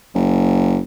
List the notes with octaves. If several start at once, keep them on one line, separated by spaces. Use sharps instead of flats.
F#1